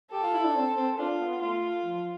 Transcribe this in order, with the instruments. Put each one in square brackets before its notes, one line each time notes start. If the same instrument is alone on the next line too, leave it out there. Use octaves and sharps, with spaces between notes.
[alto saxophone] G4 [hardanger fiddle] A4
[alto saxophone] F4
E4
D4
C4
C4
[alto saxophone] D4 [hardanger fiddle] F4
[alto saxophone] B3
[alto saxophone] A3 [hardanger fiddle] F4
[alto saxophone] F3